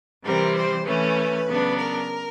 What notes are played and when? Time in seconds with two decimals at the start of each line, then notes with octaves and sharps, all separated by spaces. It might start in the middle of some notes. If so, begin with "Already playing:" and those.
0.24 C3 E3 G3 C4 A#4
0.55 C5
0.85 E3 A3 C#4 B4
1.46 C#3 F#3 B3 D4
1.77 A#4